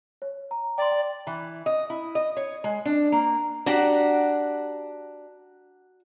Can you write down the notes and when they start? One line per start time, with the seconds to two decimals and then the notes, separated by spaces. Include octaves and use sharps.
0.22 C#5
0.51 A#5
0.78 D5 G5 C6
0.91 G5
1.27 E3
1.66 D#5
1.90 E4
2.15 D#5
2.37 C#5
2.64 G#3
2.86 D4
3.12 A#3
3.66 D4 F#4 G4 F#5 A#5